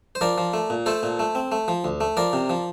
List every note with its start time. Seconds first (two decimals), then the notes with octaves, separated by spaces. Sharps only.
0.15 C5
0.21 F3 A#4 D5
0.38 F3
0.54 A3
0.70 A#2
0.86 A3 A4 C5
1.03 A#2
1.19 A3
1.35 C4
1.52 A3
1.68 F3
1.84 D2
2.01 A3
2.17 F3 A#4 D5
2.33 C3
2.49 F3